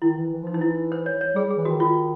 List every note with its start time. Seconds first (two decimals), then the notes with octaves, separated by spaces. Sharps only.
0.02 D#3 E4
0.17 E3
0.32 E3
0.43 F3 D#4
0.54 E3 D#4
0.61 E4
0.92 C5
1.06 C#5
1.21 C#5
1.35 G3 G#4
1.50 G#4
1.57 E3
1.65 D#3 F#4
1.80 F4